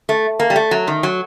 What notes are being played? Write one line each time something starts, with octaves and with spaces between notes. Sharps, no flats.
A3
A#3
G3
A3
F#3
D#3
F#3